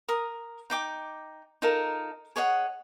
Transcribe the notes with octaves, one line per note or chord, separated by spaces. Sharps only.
A#4 D#6
D#4 G5 D6
D#4 F4 A4 A#4
G#4 C#5 D#5 F#5